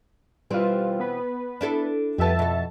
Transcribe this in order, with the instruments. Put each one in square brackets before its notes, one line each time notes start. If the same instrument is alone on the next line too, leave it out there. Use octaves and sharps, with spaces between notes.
[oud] B2 E3 C4 [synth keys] G3 F4
[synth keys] B3 B4
[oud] D4 E4 A4
[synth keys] F2 E5 A5 [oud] G3 B3
[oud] B2 A4